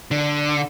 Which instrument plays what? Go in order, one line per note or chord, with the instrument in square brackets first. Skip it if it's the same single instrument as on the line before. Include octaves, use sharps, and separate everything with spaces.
[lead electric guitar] D3